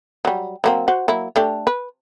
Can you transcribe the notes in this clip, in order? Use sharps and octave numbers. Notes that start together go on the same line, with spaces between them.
F#3 G3
F#3 A#3 C4
F#4 C5 F#5
F#3 A#3 E4
A3 D4 G4
B4